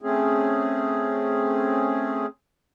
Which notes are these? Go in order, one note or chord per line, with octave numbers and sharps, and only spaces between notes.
A3 C4 C#4 G#4